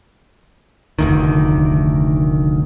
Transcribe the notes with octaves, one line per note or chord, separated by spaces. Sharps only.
F1 D2 D#3